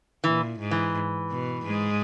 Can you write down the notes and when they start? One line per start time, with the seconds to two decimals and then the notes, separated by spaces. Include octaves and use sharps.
0.24 A#2 E3
0.60 G#2
0.71 E3
1.30 B2
1.66 G#2 G#3